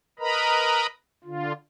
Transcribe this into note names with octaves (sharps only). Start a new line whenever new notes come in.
A#4 B4 D#5 A#5 B5
D3 F4